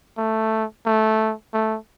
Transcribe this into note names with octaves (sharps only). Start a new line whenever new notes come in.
A3
A3
A3